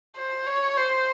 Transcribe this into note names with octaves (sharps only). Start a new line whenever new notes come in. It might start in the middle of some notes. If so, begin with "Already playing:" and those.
C5
C#5
C5